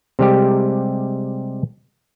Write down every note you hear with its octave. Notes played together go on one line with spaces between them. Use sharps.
C3 G3 G#3 G4